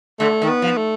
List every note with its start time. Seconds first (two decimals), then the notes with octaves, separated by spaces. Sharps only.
0.20 D3 A3
0.42 D#3
0.49 B3
0.62 F3
0.77 A3